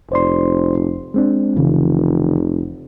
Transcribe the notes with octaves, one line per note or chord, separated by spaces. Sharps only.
F1 C5 D5 C6
G#3 C4 D4
F1 C#3 E3